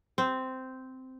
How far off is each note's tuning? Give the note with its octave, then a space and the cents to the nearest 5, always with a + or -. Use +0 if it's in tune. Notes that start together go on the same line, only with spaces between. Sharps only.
C4 -10